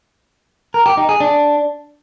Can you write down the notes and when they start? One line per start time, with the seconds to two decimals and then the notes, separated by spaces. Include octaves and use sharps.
0.74 A#4
0.86 G4
0.97 D#4
1.09 G#4
1.20 D4